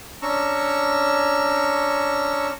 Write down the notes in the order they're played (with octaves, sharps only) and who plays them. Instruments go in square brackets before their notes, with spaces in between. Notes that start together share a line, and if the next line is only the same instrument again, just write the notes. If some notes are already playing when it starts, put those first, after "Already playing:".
[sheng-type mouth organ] C#4 D4 A#5 C#6 E6